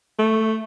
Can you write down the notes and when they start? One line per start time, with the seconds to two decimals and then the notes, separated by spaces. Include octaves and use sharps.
0.19 A3